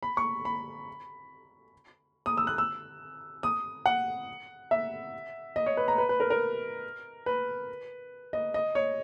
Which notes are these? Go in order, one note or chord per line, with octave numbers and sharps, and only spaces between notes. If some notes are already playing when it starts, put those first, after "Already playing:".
B5
C#6
B5
D#6
E6
F#6
E6
D#6
F#5
E5
D#5
C#5
B4
A#5
B4
B4
A#4
A#4
B4
D#5
D#5
C#5